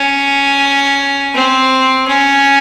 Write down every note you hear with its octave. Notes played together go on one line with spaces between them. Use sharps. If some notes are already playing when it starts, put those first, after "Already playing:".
Already playing: C#4
C4
C#4